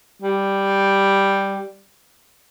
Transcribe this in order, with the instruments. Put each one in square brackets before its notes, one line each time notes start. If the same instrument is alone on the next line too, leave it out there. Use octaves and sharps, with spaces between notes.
[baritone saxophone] G3